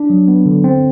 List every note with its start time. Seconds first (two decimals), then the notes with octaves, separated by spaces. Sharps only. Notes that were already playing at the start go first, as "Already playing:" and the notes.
Already playing: D4
0.10 F#3
0.28 B3
0.46 D3
0.64 C4